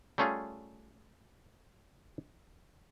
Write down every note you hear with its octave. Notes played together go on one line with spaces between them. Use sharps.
G3 A3 C#4 F4 G#4